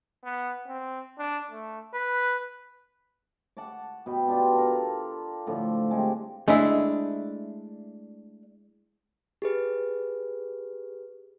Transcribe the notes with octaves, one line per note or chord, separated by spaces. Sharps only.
B3
C4
D4
A3
B4
F#5 A5 C#6 D6
B2 B4 G5
B3 D4 F4 G4
A4 A#4
A2 D3 F3
G#3 A3 C4 G4
G#3 A3 D4 E4
G4 G#4 B4